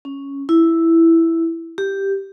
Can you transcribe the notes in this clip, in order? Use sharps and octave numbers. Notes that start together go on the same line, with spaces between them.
C#4
E4
G4